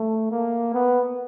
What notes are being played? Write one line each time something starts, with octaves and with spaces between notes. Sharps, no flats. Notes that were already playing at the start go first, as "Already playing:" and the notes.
Already playing: A3
A#3
B3